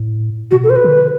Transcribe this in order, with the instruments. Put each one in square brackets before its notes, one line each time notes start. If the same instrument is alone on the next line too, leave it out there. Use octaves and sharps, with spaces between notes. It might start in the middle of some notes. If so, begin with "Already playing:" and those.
Already playing: [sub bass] A2
[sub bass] B2 [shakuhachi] F#4
[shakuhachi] A4
C5
B4
[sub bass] E3
D3